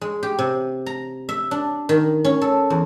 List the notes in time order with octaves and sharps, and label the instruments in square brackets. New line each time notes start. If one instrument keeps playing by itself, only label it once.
[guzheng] G#3
G4
C3
A#5
E5
D4
D#3
C#4
A4
E2